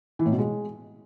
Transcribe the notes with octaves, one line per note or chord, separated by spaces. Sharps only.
E3
A2
B2
G#3